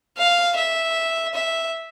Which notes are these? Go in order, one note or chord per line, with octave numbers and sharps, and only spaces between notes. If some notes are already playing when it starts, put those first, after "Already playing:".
F5
E5
E5